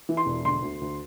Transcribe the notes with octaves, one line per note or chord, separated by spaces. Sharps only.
E3
C6
E1
D3 C6
D2
D2